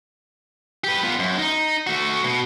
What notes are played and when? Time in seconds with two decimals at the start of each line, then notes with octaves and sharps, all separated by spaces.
0.84 G4 B4
1.03 B3 F4
1.19 F#2
1.38 D#4
1.87 A3 F#4
2.24 B2